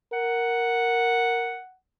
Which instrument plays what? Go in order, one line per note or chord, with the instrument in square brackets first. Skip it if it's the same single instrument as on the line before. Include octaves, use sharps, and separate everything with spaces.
[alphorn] A#4 [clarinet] F#5